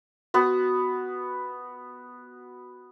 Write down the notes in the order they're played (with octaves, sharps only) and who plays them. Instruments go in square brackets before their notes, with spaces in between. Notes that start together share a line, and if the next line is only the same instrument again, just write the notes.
[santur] B3 F#4